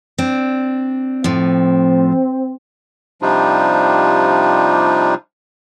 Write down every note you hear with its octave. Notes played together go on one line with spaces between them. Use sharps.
C4 D4
A2 F3 C4
C3 F3 G3 D4 D#4 F4